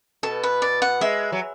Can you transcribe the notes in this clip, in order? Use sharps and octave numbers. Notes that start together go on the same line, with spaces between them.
B2 A4
B4
D5
F#5
G#3 E5
F#3